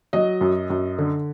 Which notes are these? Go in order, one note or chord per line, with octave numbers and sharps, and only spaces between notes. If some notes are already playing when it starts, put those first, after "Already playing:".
F#3 D#5
F#2
F#2
D3